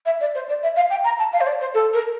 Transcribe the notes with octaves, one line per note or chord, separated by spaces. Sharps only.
E5
D5
C5
D5
E5
F5
G5
A#5
A5
F5
C5
D5
C5
A4
A#4